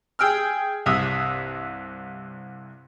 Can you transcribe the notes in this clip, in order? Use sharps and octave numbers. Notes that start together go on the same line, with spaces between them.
G#4 G5 E6 F6
C2 G2 E5 D#6